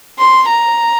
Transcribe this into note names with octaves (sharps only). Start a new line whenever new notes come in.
C6
A#5